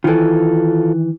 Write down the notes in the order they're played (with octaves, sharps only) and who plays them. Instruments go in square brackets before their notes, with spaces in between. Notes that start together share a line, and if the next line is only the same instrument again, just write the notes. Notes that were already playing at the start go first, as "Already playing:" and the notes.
[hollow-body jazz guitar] D#3 E3 [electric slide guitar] F4 A4